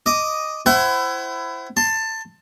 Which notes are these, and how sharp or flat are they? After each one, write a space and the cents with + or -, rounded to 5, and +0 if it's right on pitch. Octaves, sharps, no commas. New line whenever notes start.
D#5 +0 D6 +0
E4 +20 C5 +0 F#5 +35
A5 +15 C6 +0